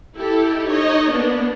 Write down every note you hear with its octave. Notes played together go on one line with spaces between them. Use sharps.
E4 G4 A4
D#4 C#5 D#5
A#3 B3 D4